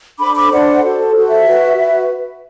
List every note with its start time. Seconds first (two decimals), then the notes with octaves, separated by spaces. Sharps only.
0.19 D4 A4 C5 B5 D6
0.35 B5 D6
0.51 D4 A4 C5 D5 F#5
0.82 F#4 A4 C5
1.14 F#4 A4 C5
1.30 E5
1.45 F#4 B4
1.77 F#4 B4